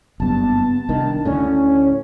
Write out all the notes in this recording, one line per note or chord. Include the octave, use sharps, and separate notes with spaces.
F#1 G2 B3 A5
C2 D#3 D4
D2 A2 D3 C#4
C#5